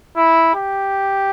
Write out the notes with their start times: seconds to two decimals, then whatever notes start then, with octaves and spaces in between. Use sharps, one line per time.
0.16 E4
0.54 G4